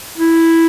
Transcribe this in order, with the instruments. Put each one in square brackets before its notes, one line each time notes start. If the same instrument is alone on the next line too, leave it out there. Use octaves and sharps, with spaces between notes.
[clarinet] E4